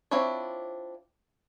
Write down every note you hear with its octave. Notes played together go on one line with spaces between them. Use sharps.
C4 D4 E4 F4 C#5